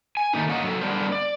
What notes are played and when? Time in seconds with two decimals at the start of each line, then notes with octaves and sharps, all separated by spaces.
0.17 G#5
0.33 D#3 A3 A#3 D#4
0.49 A#3 C#4 D#5 F#5
0.64 F#3 A4
0.81 D3 G3 B3 D4 A#4 C5
1.12 D5